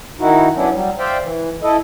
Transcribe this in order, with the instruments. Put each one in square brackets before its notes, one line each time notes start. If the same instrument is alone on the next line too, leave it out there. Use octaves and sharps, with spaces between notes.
[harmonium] D#3 D#4 E4 F#4
F#3 B3 C#4 D4 E4
F#3 G3
C5 D5 E5 F5 G5
E3
E4 A4 D#5